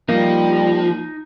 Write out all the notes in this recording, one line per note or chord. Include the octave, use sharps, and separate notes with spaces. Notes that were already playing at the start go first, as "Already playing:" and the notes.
F3 G3 A#3 D#4